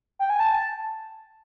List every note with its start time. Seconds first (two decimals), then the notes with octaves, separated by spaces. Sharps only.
0.19 G5
0.30 G#5
0.40 A5